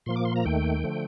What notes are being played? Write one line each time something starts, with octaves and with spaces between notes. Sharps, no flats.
A#2 F3 A#3 C6
D6
C6
A#5
D#2 D#3 A3 G5
D3 F3 A3